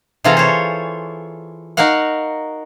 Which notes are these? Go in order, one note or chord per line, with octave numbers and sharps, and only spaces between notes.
C3 E3 F4 G#4 A4 A#5
C5 C#5
D#4 F#4 A#4 F5 F#5